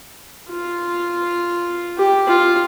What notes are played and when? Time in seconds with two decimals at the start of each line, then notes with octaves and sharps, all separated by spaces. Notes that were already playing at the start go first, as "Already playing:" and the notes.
0.50 F4
1.98 G4
2.27 F4